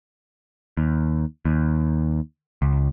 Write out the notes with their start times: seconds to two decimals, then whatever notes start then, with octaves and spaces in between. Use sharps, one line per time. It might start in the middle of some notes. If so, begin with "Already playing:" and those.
0.77 D#2
1.45 D#2
2.62 C#2